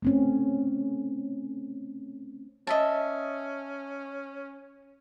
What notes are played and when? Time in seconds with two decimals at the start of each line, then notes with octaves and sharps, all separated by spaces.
0.02 A3 C4 C#4
2.67 C#4 D#5 E5 A5